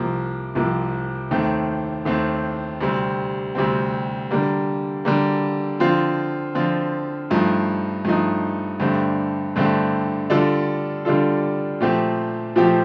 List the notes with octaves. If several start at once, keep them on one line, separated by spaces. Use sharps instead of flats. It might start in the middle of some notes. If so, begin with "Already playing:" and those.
Already playing: C2 C3 F3 A#3
C2 C3 F3 A#3
D#2 D#3 A3 C4
D#2 D#3 A3 C4
D2 C3 G3 C4
D2 C3 G3 C4
D3 G3 A#3
D3 G3 A#3
D3 F3 C4 F4
D3 F3 C4 F4
G2 F3 A3 D#4
G2 F3 A3 D#4
G2 D3 A3 C4 G4
G2 D3 A3 C4 G4
D3 G3 D4 F4 A4
D3 G3 D4 F4 A4
A#2 F3 A3 C4 G4
A#2 F3 A3 C4 G4